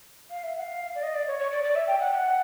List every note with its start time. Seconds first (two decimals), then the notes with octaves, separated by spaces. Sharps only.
0.30 F5
0.43 E5
0.57 F#5
0.62 F5
0.95 D5
1.03 D#5
1.14 D5
1.27 C#5
1.39 C#5
1.52 D5
1.64 D5
1.75 E5
1.87 G5
2.00 F#5
2.12 G5
2.16 F#5